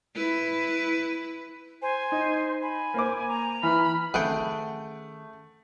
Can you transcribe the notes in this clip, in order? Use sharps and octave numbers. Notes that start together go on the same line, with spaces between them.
E4 B4
C5 G#5
D#4
G#5 B5
A#3 C5 D6
A#5
E3 B5 F6
D#3 A3 C#4 G#4 F#5 G5